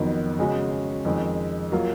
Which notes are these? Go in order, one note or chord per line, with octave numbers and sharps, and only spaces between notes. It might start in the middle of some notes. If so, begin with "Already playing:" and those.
Already playing: F2 D#3 F#3 B3
C#3 G#3 C#4 F#4
F2 D#3 G#3
F#3 A#3 F4